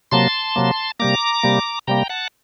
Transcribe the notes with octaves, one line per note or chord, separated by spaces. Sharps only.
C3 F#3 A#3 A5 C6
C3 F#3 A#3
C3 G3 A#3 A#5 D6
C3 G3 A#3
C3 G3 A#3 G5 A#5
F#5 A5